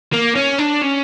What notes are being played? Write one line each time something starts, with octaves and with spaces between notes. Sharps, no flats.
A#3
C#4
D4
C#4